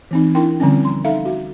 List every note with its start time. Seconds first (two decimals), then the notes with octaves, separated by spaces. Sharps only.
0.11 E3 C4 D#4
0.35 D4 E4 A#4 G5 C6
0.60 D3 F3 G3 C4 C#4
0.85 C6
1.04 D#4 A4 E5 F5 A#5
1.25 F#4